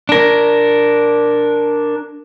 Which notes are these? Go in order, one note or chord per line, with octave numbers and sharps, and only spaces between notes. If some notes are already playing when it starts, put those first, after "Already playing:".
D4 A#4